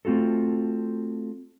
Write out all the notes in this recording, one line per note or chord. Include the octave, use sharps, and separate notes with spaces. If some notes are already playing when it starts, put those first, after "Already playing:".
A3 C4 F4 F#4 A4